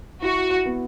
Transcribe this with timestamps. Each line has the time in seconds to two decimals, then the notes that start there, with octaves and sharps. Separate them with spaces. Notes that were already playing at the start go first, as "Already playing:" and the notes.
0.22 E4 F#4
0.66 B3